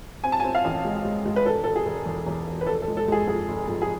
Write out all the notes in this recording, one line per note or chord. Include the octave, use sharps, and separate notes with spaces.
C4 G#5
A5
G#5
C4
F5
A1
G#3
G#3
G#3
B4
E1 A4
E1 A4
G#4
E1
E2
E2
E1
B4
F1 A4
A4
G#3
A4
G#3 G#4
F2 G#4
F1
F2
G#4